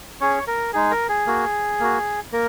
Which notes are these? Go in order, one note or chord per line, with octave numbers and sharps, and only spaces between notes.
C#4 G#4 C#5
A#4
G#3 D#4 G#4
A#4
G#4
A#3 F#4
A#3 F#4
A#3 A#4